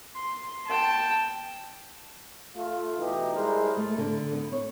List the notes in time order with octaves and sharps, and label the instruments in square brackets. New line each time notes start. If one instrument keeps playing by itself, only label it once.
[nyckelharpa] C6
G5 A5
[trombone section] A3 F4
B2 E3 A3 D#4 G4
G3 G#3 E4 A#4 C5
[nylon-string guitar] A3
D3
B3
C#5